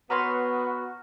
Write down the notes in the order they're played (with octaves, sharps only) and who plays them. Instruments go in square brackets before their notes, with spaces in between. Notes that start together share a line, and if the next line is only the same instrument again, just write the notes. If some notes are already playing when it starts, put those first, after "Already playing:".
[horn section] B3 [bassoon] F#4 [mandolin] B4 C#5 C6 [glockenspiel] A#5 F6 A#6